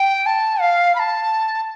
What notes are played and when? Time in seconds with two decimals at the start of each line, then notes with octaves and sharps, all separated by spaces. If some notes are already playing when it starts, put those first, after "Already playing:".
Already playing: G5
0.26 A5
0.61 F5
0.95 B5
0.99 A5